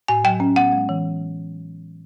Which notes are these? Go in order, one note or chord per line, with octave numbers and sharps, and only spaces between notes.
A2 G#5
F#3 G5
C#4
B3 F#5
G#3
E3